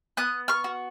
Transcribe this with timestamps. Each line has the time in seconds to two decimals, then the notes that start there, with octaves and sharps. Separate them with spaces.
0.17 B3 D#6 F#6
0.48 C#6 F6
0.64 F#4